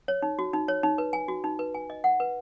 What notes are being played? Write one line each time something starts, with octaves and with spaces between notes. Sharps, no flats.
C#5
D#4
F#4
D#4
C#5
D#4
B4
G#5
F#4
D#4
B4
G#5
D#5
F#5
B4